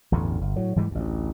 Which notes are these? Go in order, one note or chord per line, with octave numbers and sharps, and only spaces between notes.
A1 E2 G2 D3
G1
A2 F#3
G#2 E3 G3 G#3
A1 D2